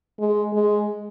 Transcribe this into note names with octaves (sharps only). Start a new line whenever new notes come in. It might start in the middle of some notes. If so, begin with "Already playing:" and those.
G#3
G#3